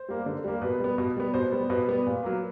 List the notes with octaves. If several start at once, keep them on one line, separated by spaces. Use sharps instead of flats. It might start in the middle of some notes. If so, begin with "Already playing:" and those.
Already playing: C5
G3 A#3
D3
G3 A#3
B2 B4
G3 B3
B2
G3 B3
B2 C5
G3 B3
B2 B4
G3 B3
A#2
F#3 A#3